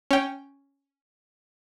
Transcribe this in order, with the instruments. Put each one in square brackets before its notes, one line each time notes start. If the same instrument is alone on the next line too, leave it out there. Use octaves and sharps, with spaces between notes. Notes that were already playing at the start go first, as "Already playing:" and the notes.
[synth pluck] C#4 G5